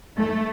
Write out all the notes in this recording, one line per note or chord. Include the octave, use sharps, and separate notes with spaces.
A3